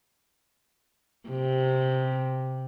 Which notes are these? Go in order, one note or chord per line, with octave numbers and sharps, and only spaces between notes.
C3